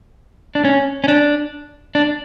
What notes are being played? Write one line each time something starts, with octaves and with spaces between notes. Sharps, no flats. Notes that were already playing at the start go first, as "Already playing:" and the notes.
D4
C#4
C#4
D4
D4